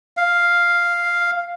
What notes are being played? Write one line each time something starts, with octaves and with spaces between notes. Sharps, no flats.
F5